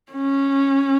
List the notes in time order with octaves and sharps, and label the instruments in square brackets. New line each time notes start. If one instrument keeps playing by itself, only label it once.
[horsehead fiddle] C#4